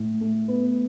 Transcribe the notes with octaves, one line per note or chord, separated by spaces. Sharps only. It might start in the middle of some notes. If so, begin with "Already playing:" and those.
Already playing: A2
A3
B3